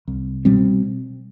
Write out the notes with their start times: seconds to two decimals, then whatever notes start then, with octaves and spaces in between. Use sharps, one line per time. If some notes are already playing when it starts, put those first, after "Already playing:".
0.08 C2
0.45 B2 G3 C4